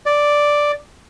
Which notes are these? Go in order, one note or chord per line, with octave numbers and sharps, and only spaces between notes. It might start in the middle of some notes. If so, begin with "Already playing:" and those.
D5